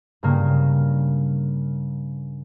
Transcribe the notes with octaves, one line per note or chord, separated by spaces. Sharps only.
G2 C#3 A#3